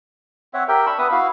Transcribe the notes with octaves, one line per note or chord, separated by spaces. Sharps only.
C4 C#5 E5 F#5
G4 A#4 E5 G5
D4 B5 C#6 E6
B3 B4 E5 D#6
E4 F#4 F5